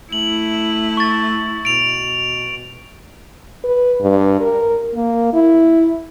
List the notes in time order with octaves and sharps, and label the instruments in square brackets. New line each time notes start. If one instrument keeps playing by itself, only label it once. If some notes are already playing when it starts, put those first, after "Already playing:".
[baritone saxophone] A3 [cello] E4 [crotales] F#7
[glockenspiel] C#6 A6
[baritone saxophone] B2 [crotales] D7 F7
[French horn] B4
G2
A#4
A#3
E4